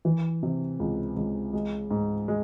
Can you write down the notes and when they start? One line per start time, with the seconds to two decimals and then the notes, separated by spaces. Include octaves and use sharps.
0.05 E3
0.43 C3
0.80 C#2
1.17 C#2
1.53 G#3
1.91 G#2
2.28 G#3